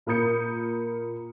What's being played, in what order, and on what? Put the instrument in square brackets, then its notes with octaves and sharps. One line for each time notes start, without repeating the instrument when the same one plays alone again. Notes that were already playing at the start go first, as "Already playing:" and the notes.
[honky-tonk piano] A#2 A#4 B5 D#6 G6 C#7